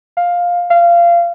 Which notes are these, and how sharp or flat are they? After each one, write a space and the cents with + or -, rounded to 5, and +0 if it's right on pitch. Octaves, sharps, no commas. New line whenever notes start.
F5 +10
F5 -25